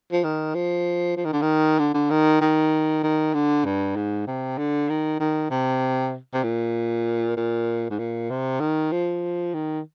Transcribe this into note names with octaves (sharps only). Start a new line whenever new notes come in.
F3
D#3
F3
F3
D#3
D3
D#3
D3
D3
D#3
D#3
D#3
D3
G2
G#2
C3
D3
D#3
D#3
C3
C3
A#2
A#2
G#2
A#2
C3
D#3
F3
D#3